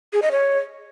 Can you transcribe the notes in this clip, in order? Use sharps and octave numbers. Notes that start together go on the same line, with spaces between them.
G#4
D#5
C#5